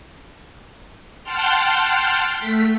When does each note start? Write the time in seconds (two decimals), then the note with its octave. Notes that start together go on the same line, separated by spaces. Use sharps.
1.23 F#5 G5 A5 C6 F6
2.39 A3 B6